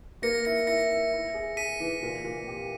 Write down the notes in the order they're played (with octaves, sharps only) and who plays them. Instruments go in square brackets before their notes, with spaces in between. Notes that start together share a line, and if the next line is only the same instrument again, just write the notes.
[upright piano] A#3 [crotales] A#6 C#7
[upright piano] E4 [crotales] A#6 C#7
[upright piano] E4 [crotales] A#6 C#7
[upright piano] E4
E4
G#4
[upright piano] G#4 [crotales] B6 D#7
[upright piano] E3
A#2
A#2
G4